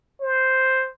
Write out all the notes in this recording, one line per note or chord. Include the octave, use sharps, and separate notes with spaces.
C5